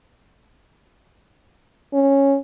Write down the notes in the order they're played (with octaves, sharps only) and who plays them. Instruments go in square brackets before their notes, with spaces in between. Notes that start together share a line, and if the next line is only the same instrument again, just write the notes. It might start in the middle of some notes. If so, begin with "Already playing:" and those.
[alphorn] C#4